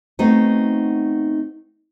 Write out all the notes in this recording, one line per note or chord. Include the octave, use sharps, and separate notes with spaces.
A3 B3 C4 D#4 F#4